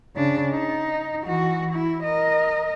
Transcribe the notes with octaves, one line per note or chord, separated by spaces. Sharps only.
C#3 D4
D#4
E3 F#4
E4
A#4 D#5